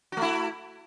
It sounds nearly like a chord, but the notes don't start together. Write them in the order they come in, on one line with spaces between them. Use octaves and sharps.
F#4 A3 E4